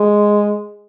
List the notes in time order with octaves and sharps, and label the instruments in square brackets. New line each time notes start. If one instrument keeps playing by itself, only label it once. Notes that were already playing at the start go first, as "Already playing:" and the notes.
Already playing: [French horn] G#3